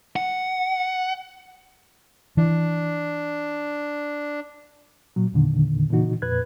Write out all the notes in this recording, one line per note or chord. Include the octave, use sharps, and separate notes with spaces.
F#5
E3 D4
A#2 F#3
E2 A#2 D3 D#3
A#2 C#3 E3 D#4 F#4
F2 A#2 B4 F#6 G#6